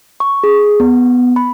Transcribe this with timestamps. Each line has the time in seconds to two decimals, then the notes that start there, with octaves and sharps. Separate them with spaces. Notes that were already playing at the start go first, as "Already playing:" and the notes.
0.20 C#6
0.44 G#4
0.80 B3
1.36 B5